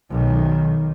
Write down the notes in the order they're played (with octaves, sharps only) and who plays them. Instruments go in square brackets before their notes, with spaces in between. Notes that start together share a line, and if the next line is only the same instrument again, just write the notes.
[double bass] B1 D#3